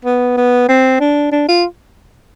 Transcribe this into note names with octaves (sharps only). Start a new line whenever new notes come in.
B3
B3
C4
D4
D4
F4